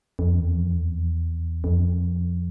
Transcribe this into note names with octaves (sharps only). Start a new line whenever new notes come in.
F2
E2
F2
E2
F2